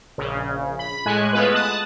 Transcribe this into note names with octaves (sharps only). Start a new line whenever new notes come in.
A#1 C#3
B5
A2 G#3 G#5 F#6
G#3 A3 B3 F4 B4
A5 D#6 F#6